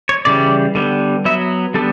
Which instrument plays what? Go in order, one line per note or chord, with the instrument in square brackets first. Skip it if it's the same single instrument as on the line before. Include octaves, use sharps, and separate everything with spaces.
[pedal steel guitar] C#5
C#3 E3 G3 D5
D3 G3 B3
F#3 B3 E5
D3 G3 B3 A4